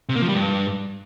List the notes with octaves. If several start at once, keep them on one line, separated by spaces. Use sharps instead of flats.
C3
A#3
F3
G3
G2